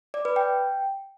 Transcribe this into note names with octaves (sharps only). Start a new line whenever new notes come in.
D5
B4
G5